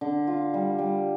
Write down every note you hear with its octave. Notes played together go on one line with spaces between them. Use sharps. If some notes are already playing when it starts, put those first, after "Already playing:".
D3
F4
G3
G3